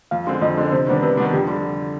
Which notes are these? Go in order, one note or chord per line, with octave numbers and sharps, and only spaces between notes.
F2 F5
D3 G#3 C4
F2 D#5
D3 G#3 C4
C3 C5
D#3 G3 B3 D4
C3 B4
D#3 G3 B3 D4
F2 G4
D3 G3